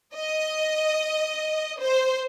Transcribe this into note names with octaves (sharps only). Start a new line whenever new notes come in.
D#5
C5